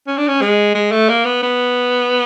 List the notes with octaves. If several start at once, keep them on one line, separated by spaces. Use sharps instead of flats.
C#4
D4
C#4
G#3
G#3
A3
A#3
B3
B3